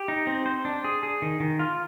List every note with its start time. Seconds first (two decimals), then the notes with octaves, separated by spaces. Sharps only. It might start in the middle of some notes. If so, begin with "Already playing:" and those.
Already playing: G4
0.08 D#4
0.27 C4
0.46 C5
0.65 D4
0.84 G#4
1.03 G#4
1.22 D#3
1.40 D#3
1.59 F4